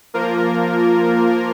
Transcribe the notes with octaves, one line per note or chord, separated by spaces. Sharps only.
F3 A#3 F4 A#4